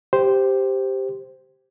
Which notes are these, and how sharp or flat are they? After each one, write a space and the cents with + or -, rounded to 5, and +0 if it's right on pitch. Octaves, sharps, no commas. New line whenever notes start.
G4 +0 C5 -5